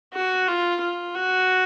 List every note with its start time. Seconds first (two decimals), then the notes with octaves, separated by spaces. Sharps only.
0.14 F#4
0.48 F4
0.82 F4
1.15 F#4